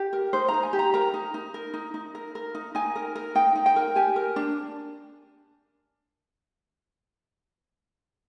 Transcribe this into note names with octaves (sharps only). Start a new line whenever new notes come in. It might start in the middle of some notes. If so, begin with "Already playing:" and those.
Already playing: G4
A#4
D#4 C5
A#5
D#4
G#5
G4
A#5
A#4 A#5
D#4
D#4
A#4
D#4
D#4
A#4
A#4
D#4
D#4 G#5
A#4
A#4
D#4 G5
D#4
G5
A#4
G4 G#5
A#4
D4